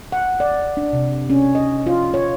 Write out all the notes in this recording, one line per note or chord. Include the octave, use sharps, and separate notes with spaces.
F#5
D5
D4
C3
C#4
D#5
F4
C#5